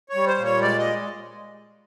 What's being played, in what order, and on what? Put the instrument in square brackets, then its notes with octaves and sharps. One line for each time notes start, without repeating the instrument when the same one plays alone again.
[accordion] C#5
G3
C5
A#2
C#5
G#3 D5
D#5